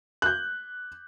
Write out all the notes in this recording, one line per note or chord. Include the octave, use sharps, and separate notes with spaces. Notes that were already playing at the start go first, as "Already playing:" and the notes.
F#6 G6